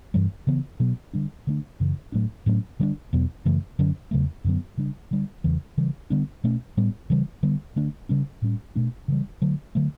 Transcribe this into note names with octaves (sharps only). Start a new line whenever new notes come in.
G2 E3 G3
C#3 E3 B3
B2 F#3 B3
D3 G3 D4
D3 A3 D4
F#2 C#3 E3
A2 F#3 A3 D4
A2 F#3 A3 C#4
D3 G3 B3 D4
E2 B2 F#3 B3
F#2 C#3 E3 A3
F#2 D3 F#3 C#4
E2 C#3 F#3 A3
F#2 D3 F#3 B3
C#3 G3 D4
D3 G3 D4
E2 C#3 E3 G3
C#3 E3 G3
D3 G3 B3 D4
B2 A3 C#4
A2 G3 B3
C#3 E3 G3
D3 G3 B3
D3 A3 D4
C#3 G3 C#4
A2 G3 C#4
B2 A3 D4
C#3 E3 G3
D3 F#3 A3
D3 F#3 A3